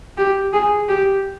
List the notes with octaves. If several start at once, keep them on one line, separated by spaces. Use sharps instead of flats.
G4
G#4
G4